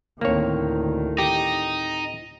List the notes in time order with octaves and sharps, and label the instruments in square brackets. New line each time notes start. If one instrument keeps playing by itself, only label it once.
[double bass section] D2 D#3 [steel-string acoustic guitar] A2 C4 [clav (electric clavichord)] A#3 C#5
[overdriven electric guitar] D#4 [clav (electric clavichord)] G4